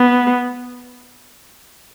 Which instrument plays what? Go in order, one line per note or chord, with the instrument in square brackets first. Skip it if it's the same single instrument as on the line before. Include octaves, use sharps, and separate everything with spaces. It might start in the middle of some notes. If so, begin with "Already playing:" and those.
Already playing: [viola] B3